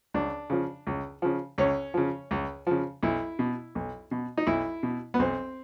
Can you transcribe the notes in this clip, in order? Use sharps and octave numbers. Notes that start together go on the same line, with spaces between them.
C#2 D4
C#3 F3
C#2
C#3 F3
C#2 C#4
C#3 F3
C#2
C#3 F3
B1 E4
B2
B1
B2
D#4
B1 E4
B2
B3
B1 C4